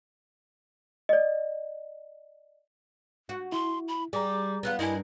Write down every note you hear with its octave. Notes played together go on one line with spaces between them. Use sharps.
D5 D#5
F#4
E4 C6
B5
G3 G#4 A#5 D6
B3 C4 F4 F#6
G2 A#3 E4 D#5 G#5